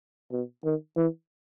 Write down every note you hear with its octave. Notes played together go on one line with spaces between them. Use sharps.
B2
D#3
E3